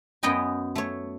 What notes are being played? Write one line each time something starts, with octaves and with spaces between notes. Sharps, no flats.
F#2 B3 B4 D#5 G5 G#5
A3 C#5